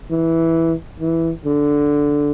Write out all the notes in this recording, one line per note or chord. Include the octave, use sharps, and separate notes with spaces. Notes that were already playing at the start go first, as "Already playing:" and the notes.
E3
E3
D3